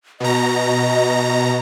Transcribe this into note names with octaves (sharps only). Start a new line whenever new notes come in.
B2 D#5 A#5